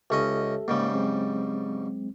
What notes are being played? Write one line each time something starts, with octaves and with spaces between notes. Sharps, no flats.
C#2 C#4 G4 A4 D#5 E5
G#2 C#3 G3 A#3
F#3 G#3 C4